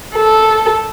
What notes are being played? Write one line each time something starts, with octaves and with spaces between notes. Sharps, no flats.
A4